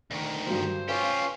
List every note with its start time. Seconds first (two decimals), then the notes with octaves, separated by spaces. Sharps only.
0.11 D2 D#3
0.46 G2 D3 F#3 C5
0.88 C#4 F4 G4 B4 F5